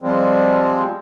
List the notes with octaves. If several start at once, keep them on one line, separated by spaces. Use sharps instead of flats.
F3 G3 G#3 C4